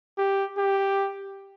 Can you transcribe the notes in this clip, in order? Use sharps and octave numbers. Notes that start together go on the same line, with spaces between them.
G4
G4